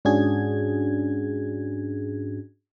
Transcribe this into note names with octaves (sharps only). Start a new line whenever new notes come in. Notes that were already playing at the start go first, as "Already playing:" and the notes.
G#2 C#4 D4 F#4 G#4 G#6